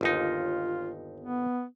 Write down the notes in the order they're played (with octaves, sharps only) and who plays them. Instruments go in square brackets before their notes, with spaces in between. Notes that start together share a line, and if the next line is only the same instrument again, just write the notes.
[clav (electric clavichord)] G1 D#2 D#4 [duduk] F4
[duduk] B3